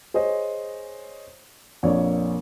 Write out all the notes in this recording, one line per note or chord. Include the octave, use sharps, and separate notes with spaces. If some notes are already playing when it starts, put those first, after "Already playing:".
G#4 C5 C#5 D#5
A#1 F2 A#3 C#5 D5